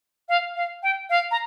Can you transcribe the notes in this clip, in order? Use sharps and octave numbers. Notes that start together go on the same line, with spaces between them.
F5
F5
G5
F5
A#5